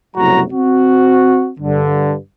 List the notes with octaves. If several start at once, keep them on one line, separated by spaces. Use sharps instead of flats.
F#1 C2 A2 F#3 F#4 A#5
C4 F#4
G2 D3